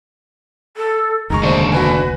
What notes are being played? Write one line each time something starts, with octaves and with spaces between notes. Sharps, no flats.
A4
F1 D2 D#3 G#3 A#5 C#6
D#2 D4 C5
F#4 B4 G#5